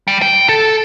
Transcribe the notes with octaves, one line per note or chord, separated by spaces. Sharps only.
G3
G5
A4